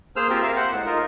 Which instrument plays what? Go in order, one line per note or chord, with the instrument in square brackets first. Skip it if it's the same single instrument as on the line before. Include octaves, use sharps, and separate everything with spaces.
[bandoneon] A#3 G#4 C5 E6 F6
A#3 C4 F4 G4 A#4
A#4 E5 F5
C5 F#5
A2 G#3
D#4 F4 A#4